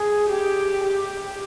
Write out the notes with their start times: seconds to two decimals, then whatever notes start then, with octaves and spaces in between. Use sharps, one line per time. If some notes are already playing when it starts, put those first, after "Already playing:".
Already playing: G#4
0.30 G4
0.84 G4